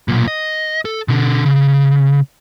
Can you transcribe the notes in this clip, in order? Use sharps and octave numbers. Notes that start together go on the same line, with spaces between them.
B1 A#2
D#5
A4
B2 D3
C#3